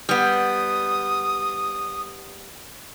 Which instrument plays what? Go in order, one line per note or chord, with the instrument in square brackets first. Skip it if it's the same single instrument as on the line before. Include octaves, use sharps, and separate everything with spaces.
[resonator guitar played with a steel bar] G3 B3 [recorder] D#6